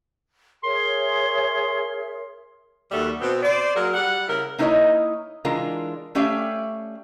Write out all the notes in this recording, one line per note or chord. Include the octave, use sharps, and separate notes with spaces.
G#4 A#4 C#5 E5 C6
D#2 G3 F#4 A4 E5
B2 B3 C4
C5 D5
F#3 A#3 G#4 A#4 F#5
G3 F#5
C#3 E4 A#4
A#3 D#4 E4 A#4 C#5 D#5
E3 G#3 D4 F4 A#4
A3 C#4 G4 D5 E5 F5